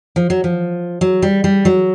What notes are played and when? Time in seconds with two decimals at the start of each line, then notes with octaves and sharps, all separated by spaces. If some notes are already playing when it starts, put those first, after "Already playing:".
0.16 F3
0.30 F#3
0.44 F3
1.01 F#3
1.22 G3
1.44 G3
1.65 F#3